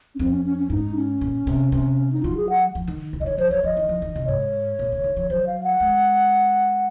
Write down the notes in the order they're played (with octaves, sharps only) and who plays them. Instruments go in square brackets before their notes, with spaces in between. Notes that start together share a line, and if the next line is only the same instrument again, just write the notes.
[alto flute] C#4
[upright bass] F2 [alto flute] C4
[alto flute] C#4
C#4
C#4
[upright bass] G#2 [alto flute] D#4
[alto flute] C#4
[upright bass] A#2
C3
C3
[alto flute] D#4
[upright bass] F#3 [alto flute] F4
[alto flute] G#4
F#5
[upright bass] F3
D#3
C3
[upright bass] C#3 [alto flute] D#5
[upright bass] D#3 [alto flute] C#5
[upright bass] F3 [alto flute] C5
[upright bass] F#3 [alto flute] C#5
[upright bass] F3 [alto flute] D#5
[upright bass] D#3
F3
D#3
C3
[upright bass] G#2 [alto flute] C#5
[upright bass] A#2
C#3
D#3
F3
[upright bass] F#3 [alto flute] C5
[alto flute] F5
F#5
[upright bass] G#3